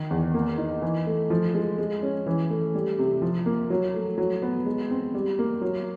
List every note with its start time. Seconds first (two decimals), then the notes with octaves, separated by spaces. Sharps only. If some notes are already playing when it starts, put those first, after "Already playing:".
Already playing: D#3
0.11 E2
0.34 A#3
0.58 D#4
0.82 E3
1.07 A3
1.30 F3
1.54 G#3
1.78 G#3
2.03 C#4
2.26 E3
2.50 A3
2.75 G3
2.99 C3
3.22 F3
3.46 A#3
3.70 F#3
3.94 A3
4.18 F#3
4.42 B3
4.66 G#3
4.91 C4
5.14 G3
5.39 A#3
5.62 F#3